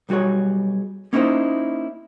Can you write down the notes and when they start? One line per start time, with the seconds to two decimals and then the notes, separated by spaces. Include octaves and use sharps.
0.09 B1 G3 F#4 G#4 C#5
1.13 A#3 C#4 D#4 E4 C5